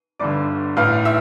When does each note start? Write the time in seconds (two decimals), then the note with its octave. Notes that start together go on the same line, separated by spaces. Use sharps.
0.19 G1 G2 D3 D5 D6
0.77 A1 A2 E3 F5 F6
1.05 E5 E6